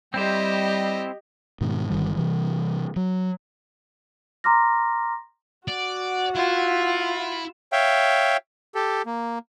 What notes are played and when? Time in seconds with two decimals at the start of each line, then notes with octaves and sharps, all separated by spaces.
0.14 G3 C4 E4 G4 C5 D#5
1.61 G#2 B2 D#3
1.90 G1 C2 D#3 G3
2.15 C3 E3 G3
2.96 F#3
4.44 A#5 C6 D6 F6 A#6
5.68 F#4 D5 F#5
6.36 E4 F4
7.72 C#5 E5 F5 G5
8.75 G4 A4
9.06 A#3